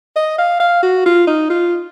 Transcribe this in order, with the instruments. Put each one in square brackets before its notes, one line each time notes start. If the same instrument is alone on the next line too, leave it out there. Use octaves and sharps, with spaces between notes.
[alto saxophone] D#5
F5
F5
F#4
F4
D#4
F4